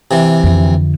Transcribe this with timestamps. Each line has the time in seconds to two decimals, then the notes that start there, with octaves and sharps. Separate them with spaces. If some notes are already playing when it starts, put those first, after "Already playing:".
0.11 C3 E3
0.43 F2 D3